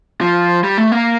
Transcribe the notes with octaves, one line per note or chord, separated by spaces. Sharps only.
F3
G3
A3
A#3